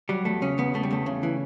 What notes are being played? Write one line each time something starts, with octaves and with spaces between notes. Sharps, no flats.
F#3 G3
E2 A3
C#3 C#4
E2 B3
C#3 A3
G3
E2 A3
C#3
E3